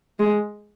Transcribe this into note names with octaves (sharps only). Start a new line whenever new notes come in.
G#3